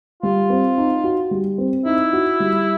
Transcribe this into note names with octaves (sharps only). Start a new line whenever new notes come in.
G3 F4
C4
D#4
F#4
G3
C4
D#4 E4
F#4
G3